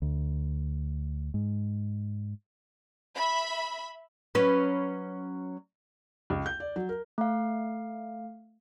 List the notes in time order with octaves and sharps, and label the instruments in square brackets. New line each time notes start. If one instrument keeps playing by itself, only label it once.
[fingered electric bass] D2
G#2
[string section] E5 B5
[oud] F#3 C#4 B4
[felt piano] C#2
G6
D5
F#3
A#4
[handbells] A3 F5